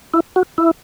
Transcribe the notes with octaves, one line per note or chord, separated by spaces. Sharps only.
E4
F#4
E4